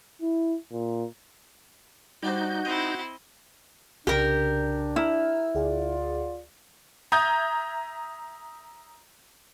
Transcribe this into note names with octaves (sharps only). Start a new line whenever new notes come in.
E4
A#2
G3 D4 D#4 F#4 C5 G6
C4 E4 D#5
C2 C#3 D4 G4 A#4
E4 A#5 E6 F6
D2 F4 G#4 D5 F#5
E5 A#5 D#6 G6 G#6